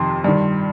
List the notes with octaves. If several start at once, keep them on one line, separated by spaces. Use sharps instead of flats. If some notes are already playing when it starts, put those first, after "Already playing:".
Already playing: F2 C3 D#3 C6
G2 D#3